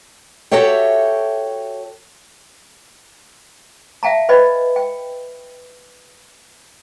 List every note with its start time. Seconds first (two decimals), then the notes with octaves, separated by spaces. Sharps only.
0.51 F#4 G4 A4 C#5 E5 G5
4.03 E5 F5 G5 A5 A#5
4.29 B4 C5 D5 D#5 G5 B5
4.76 G5